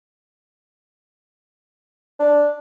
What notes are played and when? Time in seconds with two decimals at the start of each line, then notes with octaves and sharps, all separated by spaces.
2.20 D4